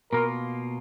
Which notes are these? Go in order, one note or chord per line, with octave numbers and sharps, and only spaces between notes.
B2 A#3 F4 A#4